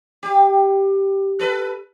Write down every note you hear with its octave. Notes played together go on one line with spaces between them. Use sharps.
G4
A4 B4